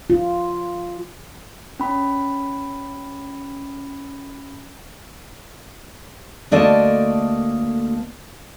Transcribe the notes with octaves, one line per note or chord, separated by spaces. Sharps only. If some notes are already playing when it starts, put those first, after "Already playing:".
F4
C#4 B5
D2 A3 A#3 D5 D#5 A5